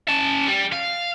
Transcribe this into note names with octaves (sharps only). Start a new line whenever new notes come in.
C#4 A5
G3
F5